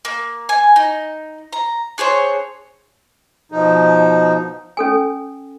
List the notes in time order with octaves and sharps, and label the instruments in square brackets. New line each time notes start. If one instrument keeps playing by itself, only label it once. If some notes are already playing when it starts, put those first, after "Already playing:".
[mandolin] A#3
G#5
D#4
A#5
D4 G#4 C5 C#5
[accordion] B2 F3 D#4
[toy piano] C#4 A4 G#5